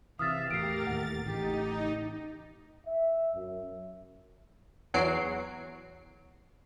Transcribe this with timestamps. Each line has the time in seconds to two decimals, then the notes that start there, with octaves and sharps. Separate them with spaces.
0.19 C3 E3 E5 F5 D#6 F6 A6
0.51 E2 A2 G4 A#4 A6 C7 D7
0.87 D#2 A2 A3 F#5
1.26 A1 C#3 D#4 G4
2.87 E5
3.35 F#2
4.94 E2 F#3 C7 D7